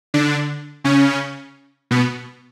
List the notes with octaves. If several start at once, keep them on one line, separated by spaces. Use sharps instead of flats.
D3 D4
C#3 C#4
B2 B3